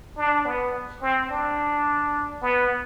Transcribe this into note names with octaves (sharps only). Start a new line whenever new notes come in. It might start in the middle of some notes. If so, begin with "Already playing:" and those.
D4
B3
C4
D4
B3